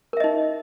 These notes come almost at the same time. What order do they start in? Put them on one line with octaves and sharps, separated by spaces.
A#4 E5 D#5 D#4